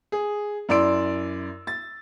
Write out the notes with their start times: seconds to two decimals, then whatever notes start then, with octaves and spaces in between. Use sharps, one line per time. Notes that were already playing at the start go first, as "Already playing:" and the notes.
0.12 G#4
0.69 F#2 E4 D5 C6 E6 D7
1.67 A6